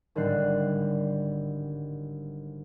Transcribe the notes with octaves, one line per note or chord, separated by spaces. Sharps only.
G#1 A2 D3 G3 F#6 C7